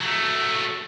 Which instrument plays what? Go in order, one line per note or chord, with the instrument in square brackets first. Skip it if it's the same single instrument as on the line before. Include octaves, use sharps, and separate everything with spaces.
[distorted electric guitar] F#3 A3